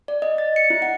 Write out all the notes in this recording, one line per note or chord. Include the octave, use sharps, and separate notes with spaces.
D5
D#5
A6
C#7
E4
F#5